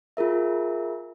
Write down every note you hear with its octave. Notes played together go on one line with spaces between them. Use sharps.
F4 G#4 A#4 E5